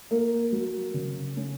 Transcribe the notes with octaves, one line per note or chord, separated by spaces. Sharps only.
A#3
F#3
C#3
C#4